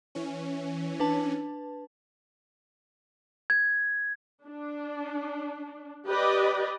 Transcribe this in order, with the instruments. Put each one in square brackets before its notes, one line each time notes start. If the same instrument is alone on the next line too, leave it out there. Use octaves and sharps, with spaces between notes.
[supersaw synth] E3 C#4
[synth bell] D4 B4 A5
[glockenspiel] G#6
[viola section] D4
G4 B4 D5 D#5